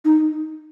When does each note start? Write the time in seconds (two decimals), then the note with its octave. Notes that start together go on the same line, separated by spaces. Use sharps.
0.05 D#4